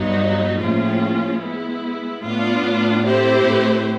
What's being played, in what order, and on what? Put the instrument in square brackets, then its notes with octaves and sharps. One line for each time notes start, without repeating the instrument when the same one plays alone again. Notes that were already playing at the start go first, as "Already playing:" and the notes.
Already playing: [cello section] G2 [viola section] F#3 B3 D#4
[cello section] A2 [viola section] F3 A#3 C#4 F4 G#4
[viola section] G#3 B3 E4
[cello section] A2 [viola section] B3 D4 F4
[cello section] A2
[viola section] A3 C4 E4 G4 C5
[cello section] A2